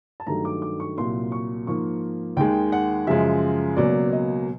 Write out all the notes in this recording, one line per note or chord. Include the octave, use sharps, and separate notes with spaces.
A5
G2 D#3 F#3 A3 A#5
D6
D6
C#6
C2 A#2 F#3 C6
C#6
G#2 F3 A#3 C#6
D#2 D#3 G#3 G5
F#5
F#2 C#3 F3 G#3 E5
C#2 B2 F#3 A#3 D5
D#5